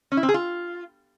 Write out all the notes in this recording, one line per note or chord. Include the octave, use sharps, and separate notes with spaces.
C#4
E4
C4
G#4
F4